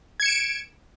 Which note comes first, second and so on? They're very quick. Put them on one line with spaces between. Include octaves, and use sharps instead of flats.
G#6 C#7 E7 D7